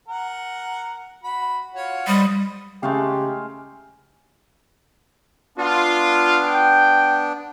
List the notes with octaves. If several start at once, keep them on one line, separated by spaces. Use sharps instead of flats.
A#4 F#5
F#4 B5
F4 F#4 C#5
G3 B4 C5 D#5
C#3 G#3 A3 G4 F5
B3 D4 F4
G5